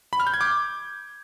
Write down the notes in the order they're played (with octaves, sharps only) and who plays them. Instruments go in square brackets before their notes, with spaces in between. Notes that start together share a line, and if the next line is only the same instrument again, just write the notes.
[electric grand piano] B5
F6
G6
G#6
D6